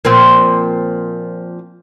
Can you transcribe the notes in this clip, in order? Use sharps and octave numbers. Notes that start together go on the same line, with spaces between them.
A#2 F3 C4